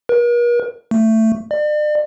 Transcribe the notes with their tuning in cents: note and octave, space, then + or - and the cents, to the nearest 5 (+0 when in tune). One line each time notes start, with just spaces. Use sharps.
A#4 +45
A3 +15
D5 +40